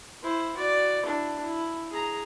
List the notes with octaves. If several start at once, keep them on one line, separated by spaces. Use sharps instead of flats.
E4 C5
F#4 D5
D4 E4
E4
G#4 A#5